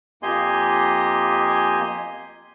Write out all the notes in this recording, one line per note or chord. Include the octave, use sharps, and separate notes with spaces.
F2 A#3 G4 D#5 G#5 C6